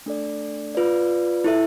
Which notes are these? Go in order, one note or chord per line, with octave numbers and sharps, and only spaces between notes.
A3 D4 A4 D5
F4 B4 D5
E4 A4 E5